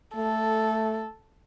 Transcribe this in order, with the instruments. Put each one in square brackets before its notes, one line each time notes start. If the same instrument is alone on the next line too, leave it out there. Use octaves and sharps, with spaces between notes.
[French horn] A3 [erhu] A4